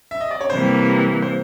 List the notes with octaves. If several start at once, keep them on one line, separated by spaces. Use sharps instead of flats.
E5
D#5
D5
C#5
C3 E3 G3 A#3 C5
C5